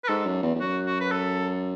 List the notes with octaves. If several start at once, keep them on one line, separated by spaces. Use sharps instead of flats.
B4
G#2 A4
F#2
E2
E2
F#2 F#4
F#4
B4
A4